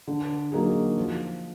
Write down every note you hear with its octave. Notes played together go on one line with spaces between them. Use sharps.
D3
F#3 A#3 D#4 G#4
F3